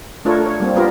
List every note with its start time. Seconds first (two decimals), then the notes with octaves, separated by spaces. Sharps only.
0.25 A3 D4 F4 A4 A#4 C#5
0.46 C#5
0.60 G3 A#3 C4
0.76 B3 D4 F4 G4 A#4